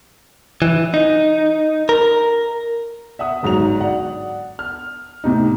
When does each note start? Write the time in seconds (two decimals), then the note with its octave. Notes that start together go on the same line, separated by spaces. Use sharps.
0.62 E3
0.94 D#4
1.89 A#4
3.19 E5 F#5 D#6
3.43 G1 G#2 F#3 F7
3.81 D5 F#5
4.59 F6
5.24 A2 C3 D#4